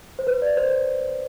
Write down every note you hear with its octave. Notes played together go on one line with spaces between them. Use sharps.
C5
B4
D5
C5